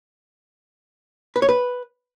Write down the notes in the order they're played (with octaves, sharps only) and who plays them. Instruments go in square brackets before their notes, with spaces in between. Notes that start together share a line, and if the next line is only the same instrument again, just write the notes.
[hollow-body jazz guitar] B4
C#5
B4